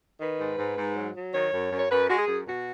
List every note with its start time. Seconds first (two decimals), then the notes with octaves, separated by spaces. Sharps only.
0.20 D#3 B4
0.39 G#2
0.58 G#2
0.77 G#2
0.96 F#3
1.15 F#3
1.34 D#3 C#5
1.52 F#2
1.72 F#2
1.79 C#5
1.90 F#2 B4
2.09 G#3 F#4
2.19 G#4
2.27 F#2
2.46 B2 F#4